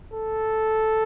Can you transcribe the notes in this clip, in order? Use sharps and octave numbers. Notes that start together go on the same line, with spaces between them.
A4